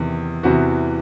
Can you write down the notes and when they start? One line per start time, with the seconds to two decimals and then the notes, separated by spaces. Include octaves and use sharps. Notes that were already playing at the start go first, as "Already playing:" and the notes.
Already playing: E2 C3 D#3
0.43 E2 C3 E3 B3 F#4